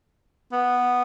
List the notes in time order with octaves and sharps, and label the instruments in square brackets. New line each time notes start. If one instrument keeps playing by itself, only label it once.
[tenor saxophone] B3